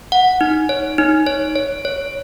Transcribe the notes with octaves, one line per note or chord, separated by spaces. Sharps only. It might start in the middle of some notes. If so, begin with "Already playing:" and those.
F#5
D#4
C#5
D#4
C#5
C#5
C#5